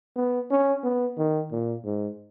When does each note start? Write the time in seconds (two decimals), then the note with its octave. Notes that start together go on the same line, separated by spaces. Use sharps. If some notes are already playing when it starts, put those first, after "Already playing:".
0.16 B3
0.51 C#4
0.84 B3
1.18 D#3
1.51 A#2
1.85 G#2